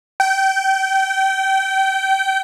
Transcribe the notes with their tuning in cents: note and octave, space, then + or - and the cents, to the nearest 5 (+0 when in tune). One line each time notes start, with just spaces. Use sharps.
G5 -25